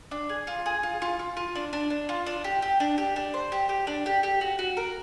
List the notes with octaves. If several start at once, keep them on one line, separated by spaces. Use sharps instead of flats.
D4
G#4
F4
G#4
F4
F4
F4
F4
D4
D4
D4
F4
D4
G4
G4
D4
G4
D4
C5
G4
G4
D4
G4
G4
F#4
F#4
A#4